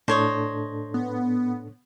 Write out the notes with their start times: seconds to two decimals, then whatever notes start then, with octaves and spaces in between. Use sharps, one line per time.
0.08 A2 D4 A4 C5 C#5 D#5
0.94 B3